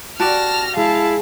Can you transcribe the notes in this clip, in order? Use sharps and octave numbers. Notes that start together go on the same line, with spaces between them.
F#4 G4 D5 A5 F6 A#6
G#3 E4 F5 A5